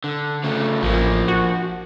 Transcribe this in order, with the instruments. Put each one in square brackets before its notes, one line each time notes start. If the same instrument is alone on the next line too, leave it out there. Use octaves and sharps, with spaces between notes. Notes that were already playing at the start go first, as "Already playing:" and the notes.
[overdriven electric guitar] D3
C#3 A3
[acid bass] A1 [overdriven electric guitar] F3 A#3
[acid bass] F#4